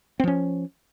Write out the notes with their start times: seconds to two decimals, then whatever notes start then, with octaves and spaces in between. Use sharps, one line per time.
0.20 C4
0.24 F3
0.28 C#4